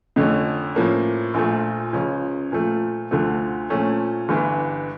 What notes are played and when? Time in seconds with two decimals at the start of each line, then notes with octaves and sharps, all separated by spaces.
0.16 F2 D3 A3 C#4
0.75 A2 F3 A#3 C#4
1.34 A#1 A#2 F3 A3
1.93 C#2 C#3 F3 C#4
2.52 A#2 F3 A3
3.11 D2 D3 F3 A3
3.70 A#2 F3 A3 C#4
4.29 G1 G2 E3